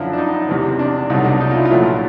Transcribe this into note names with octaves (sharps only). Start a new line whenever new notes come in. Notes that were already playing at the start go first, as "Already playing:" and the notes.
Already playing: F#2 D3 F3 E4
D4
D#4
E2 C3 E3
D4
C2 B2 F#3 A3 D#4
D4
D#4
F4
E4
F4
A#1 A#2 F#3 A3 E4